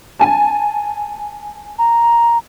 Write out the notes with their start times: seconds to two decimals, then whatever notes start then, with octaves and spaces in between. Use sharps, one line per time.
0.19 G#5 A5
1.78 A#5